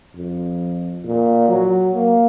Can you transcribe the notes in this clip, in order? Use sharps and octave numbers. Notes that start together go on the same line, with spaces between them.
F2
A#2
F#3
A#3